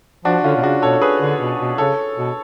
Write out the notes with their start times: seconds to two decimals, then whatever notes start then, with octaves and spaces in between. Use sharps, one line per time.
0.24 F3 D4 F#4
0.44 D3 C#4 F4
0.56 B2
0.63 C#3 D4 F#4
0.82 B2 A4 C#5
0.93 A4
1.01 G#4 B4
1.20 D3
1.40 B2
1.59 B2
1.78 C#3 A4 C#5
2.17 B2